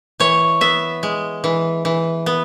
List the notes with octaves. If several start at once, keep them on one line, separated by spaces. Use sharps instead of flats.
E3 C#5
B3 E5
G#3
E3
E3
B3